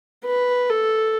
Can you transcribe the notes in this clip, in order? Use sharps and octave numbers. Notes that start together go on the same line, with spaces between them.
B4
A4